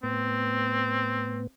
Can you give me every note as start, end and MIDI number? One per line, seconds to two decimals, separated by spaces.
0.03 1.47 45
0.03 1.47 59
0.03 1.52 60